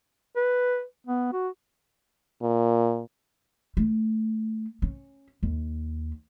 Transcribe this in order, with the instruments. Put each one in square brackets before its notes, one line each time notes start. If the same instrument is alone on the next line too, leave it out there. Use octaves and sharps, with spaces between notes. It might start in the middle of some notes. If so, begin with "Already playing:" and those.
[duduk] B4
B3
F#4
[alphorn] A#2
[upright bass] A3
C#4
D#2